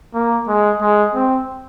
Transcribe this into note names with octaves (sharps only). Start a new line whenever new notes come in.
A#3
G#3
G#3
C4